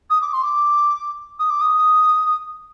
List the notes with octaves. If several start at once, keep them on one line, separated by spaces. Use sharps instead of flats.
D#6
D6
C6
D6
D#6
D6
D#6